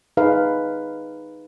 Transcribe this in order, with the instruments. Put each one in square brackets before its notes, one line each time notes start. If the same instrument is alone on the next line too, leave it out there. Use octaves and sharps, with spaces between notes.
[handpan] D#4 G#4 B4 F5